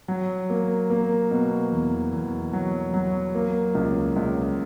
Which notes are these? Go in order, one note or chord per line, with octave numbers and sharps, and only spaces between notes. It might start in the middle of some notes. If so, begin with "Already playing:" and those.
F#3
A#3
A#3
B2
E2
E2
F#3
F#3
A#3
C#2
C#2